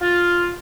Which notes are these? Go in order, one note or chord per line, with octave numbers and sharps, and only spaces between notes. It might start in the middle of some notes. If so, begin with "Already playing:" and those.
F4